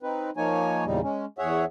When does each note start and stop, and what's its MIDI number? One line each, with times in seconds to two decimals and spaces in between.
0.03 0.30 60
0.03 0.30 63
0.03 0.30 71
0.37 0.85 53
0.37 0.85 58
0.37 0.85 63
0.37 0.85 73
0.37 0.85 80
0.85 1.00 40
0.85 1.00 46
0.85 1.00 49
0.85 1.00 55
0.85 1.00 63
1.03 1.25 56
1.03 1.25 61
1.39 1.65 40
1.39 1.65 68
1.39 1.65 73
1.39 1.65 76
1.39 1.65 78